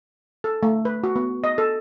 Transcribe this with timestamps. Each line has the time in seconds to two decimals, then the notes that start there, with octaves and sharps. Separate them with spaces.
0.44 A4
0.63 A3
0.85 B4
1.04 F#4
1.16 B3
1.44 D#5
1.58 A4